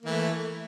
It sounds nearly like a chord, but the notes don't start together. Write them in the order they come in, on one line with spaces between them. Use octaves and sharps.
A#3 E3 A3